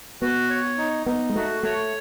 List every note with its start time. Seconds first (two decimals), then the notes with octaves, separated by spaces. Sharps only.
0.21 B3 F#4
0.50 C#5
0.78 D#4
1.06 B3 D#4
1.30 G#3
1.35 A3 F#4
1.63 A3 C#5